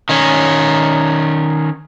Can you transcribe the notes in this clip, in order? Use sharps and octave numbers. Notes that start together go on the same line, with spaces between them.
D#3 C#4